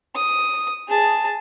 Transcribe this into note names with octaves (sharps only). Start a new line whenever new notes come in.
D#6
G#4 A5